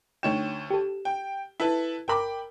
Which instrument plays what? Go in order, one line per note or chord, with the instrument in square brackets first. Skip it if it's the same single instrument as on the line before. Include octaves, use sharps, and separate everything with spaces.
[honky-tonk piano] D2 C#5 E7 [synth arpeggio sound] A3 D#4 G5
[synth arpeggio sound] G4 A4
[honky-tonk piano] G5
E4 A4 B4
[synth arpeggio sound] G1 A#4 A#5 [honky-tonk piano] G5 B5 D6